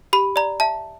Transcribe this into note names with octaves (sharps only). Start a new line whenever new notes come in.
G4 B5
D5 A#5
E5 A5